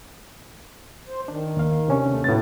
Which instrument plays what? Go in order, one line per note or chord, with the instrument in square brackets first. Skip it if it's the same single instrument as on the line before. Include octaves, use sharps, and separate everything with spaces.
[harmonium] C5
[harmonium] D#3 [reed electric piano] D4
[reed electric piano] D#2 F5
C3 C#4 D4
[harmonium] D#2 A3
[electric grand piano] A2 A6 [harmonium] F#3 B3